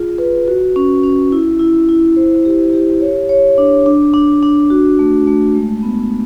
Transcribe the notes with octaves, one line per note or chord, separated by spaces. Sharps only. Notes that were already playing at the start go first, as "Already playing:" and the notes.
Already playing: F4 G#4
B4
F#4
C#4
C#4
E4
E4
E4
C5
G4
G4
C#5
C#5
D4
D4
D4
D4
F#4
A3
A3
G#3
B3